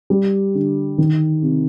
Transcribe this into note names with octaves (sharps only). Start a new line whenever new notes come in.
G3
D3
D#3
C3